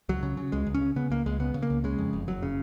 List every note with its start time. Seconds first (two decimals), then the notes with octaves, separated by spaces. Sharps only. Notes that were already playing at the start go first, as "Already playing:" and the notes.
0.09 C#2 F#3
0.23 C#3
0.37 C#3
0.52 C#2 G#3
0.66 C#2
0.74 C#4
0.81 C#3
0.96 C#3 B3
1.10 C#2 A#3
1.26 C#2 G#3
1.40 C#3 B3
1.54 C#3
1.62 A#3
1.70 C#2
1.84 C#3 G#3
1.98 F2
2.13 F#1
2.28 F#1 F#3
2.43 C#3